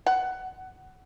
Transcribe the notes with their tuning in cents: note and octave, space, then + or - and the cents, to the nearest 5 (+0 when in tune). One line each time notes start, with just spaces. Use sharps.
F#5 +15